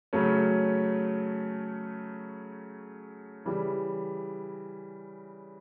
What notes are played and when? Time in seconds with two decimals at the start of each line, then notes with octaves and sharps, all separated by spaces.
0.13 C#3 F#3 A3 C#4
3.45 C#3 E3 G3